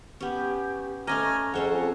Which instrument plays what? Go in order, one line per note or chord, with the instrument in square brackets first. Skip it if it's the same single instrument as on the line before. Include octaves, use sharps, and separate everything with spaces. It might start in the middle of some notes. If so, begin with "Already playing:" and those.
[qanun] B3 C#4 [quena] G4
[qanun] A3 C#4 D#5 [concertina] G#5 A#5 F6 [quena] D6
[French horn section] F2 G#4 [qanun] C#4 C5 C#5 [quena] A4 [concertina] F#5